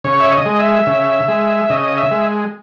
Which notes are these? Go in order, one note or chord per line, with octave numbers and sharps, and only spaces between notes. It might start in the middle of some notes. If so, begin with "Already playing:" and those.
C#3 C#5
E5
D#5
G#3
E5
C#3
G#3
C#3 D#5
E5
G#3